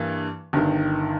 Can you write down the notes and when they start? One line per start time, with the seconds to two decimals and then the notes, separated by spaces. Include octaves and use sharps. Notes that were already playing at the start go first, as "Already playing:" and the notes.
Already playing: G2 E3 A#3
0.53 G1 G2 D#3